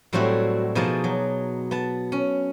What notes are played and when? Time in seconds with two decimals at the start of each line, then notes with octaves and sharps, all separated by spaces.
0.13 A2 F#3 G3 C4 E4 F#4
0.75 B2 F3 D#4 G#4 D5 A5
1.04 F#3
1.71 B3 A5
2.12 C#4